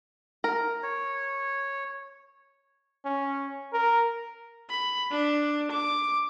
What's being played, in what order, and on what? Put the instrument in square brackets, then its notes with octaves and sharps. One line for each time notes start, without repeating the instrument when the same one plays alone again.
[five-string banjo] A#4
[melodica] C#5
[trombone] C#4
A#4
[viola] B5
D4
D6